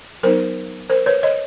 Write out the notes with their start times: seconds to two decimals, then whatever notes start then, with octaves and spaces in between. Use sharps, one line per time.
0.23 F#3 B3 D#4 A#4 C5
0.90 A#4 C5
1.06 B4 C#5
1.23 C#5 D#5